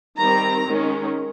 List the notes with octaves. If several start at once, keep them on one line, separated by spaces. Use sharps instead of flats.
D#3 G3 C4 A#5
D#3 G#3 C#4